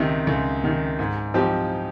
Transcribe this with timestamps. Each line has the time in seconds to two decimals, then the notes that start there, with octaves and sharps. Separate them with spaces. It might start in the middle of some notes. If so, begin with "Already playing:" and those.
Already playing: C#2 C3 D#3
0.27 C#2
0.64 C3 D#3
0.99 G#2
1.34 F3 C4 D#4 G4